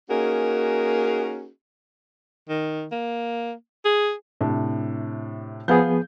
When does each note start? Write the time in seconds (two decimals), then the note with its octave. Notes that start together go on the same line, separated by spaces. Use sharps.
0.10 A#3 C#4 D#4 F#4 G#4 A#4
2.49 D#3
2.92 A#3
3.85 G#4
4.41 A2 C3 D4
5.68 F3 B3 G#4 F5 G6